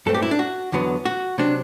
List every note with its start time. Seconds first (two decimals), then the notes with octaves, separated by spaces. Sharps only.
0.06 G2 F#3 A3 C4 A4
0.14 G4
0.22 E4
0.31 D4
0.39 F#4
0.72 E2 D3 F#3 B3
1.05 F#4
1.38 C3 F#3 C4 D4